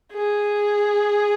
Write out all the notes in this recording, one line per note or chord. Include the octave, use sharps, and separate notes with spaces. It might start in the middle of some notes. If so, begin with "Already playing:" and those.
G#4